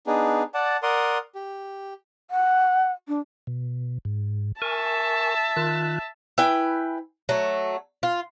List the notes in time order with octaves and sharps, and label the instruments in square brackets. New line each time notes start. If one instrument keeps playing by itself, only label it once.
[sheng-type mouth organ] B3 D4 D#4 G#4
D5 F#5 A5
A#4 D5 F#5 C6 D#6
G4
[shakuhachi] F#5
D4
[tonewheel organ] B2
G#2
[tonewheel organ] A#4 G#5 C#6 [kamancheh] E5 A5
[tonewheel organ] D#3 F4 F#6
[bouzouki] E4 B4 G5 G#5
F#3 A3
F4